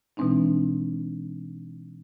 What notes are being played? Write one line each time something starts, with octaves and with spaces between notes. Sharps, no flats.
B2 E3 G#3 C4 D4 D#4